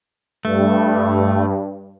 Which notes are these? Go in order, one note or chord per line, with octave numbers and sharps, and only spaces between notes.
G2 A3